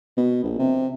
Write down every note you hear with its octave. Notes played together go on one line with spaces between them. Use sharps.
B2
A#1
C3